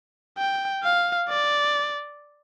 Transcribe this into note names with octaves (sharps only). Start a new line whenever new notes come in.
G5
F5
D5